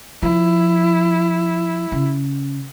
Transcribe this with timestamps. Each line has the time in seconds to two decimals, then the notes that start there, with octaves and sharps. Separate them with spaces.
0.23 F3 E4
1.92 C#3